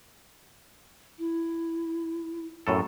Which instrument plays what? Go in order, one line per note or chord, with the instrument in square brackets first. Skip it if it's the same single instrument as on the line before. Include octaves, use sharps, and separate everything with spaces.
[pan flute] E4
[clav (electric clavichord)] F#2 A2 A4